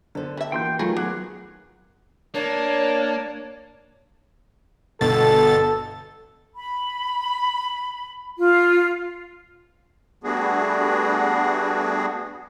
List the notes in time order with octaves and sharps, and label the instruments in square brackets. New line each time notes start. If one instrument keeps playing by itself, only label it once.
[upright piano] D3 C5 [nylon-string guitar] B3 A4
[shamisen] G3 E5
[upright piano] E3 A#3 F#4 [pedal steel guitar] G5 C6 G6
[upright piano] D#3 [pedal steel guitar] F#3 A3 [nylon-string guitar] F4 [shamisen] G#4 B4
[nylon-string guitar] F#3 [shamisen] B3 [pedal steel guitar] G#4 [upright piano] D6 F#6
[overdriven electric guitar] A#3 [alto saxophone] D4 [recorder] C#5
[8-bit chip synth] G1 B2 A6 [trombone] A4
[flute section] B5
F4
[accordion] G3 A3 B3 D4 F#4 G#4